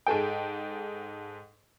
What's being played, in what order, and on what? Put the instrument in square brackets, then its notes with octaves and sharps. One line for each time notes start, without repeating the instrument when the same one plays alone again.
[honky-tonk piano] G#2 G#4 A4 G5